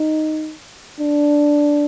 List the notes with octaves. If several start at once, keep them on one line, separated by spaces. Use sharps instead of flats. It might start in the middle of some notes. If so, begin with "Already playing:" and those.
Already playing: D#4
D4